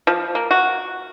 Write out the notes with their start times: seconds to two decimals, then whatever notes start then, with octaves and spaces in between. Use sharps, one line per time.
0.07 F3
0.35 A#3
0.51 F#4